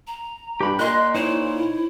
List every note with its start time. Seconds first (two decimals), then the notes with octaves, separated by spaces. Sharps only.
0.07 A#5
0.61 G2 G4 B5
0.79 A#2 D#5 C6 F#6
1.14 D#4 E4 C5 C#5